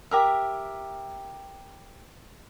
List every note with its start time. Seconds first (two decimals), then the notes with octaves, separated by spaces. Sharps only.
0.11 G4 A#4 E5